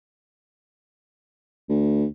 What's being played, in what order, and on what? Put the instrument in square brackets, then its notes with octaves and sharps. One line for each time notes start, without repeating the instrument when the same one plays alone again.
[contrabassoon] D2